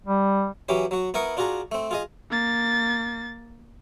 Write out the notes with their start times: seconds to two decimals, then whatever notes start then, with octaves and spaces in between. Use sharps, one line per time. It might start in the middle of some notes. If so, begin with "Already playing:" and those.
0.06 G3
0.69 E3 F#3 C#4 G4
0.91 F#3 F#4
1.14 B3 E4 A#4 C#6 D#6
1.37 D4 F4 F#4 G#4 A#5
1.72 A3 C4
1.91 F4 G#4 D#5
2.30 A#3 A6